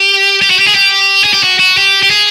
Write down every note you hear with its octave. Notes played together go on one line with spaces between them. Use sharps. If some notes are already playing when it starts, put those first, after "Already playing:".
Already playing: G4
G4
F#4
G4
G#4
G4
G#4
G4
F#4
F#4
G4
G4
G#4